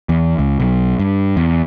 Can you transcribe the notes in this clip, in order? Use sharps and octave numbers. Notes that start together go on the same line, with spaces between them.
E2
C#2
B1
G2
E2